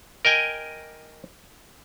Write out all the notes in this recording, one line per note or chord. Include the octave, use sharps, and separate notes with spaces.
A#4 D#5 G5 G#5